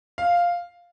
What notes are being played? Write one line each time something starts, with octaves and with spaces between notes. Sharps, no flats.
F5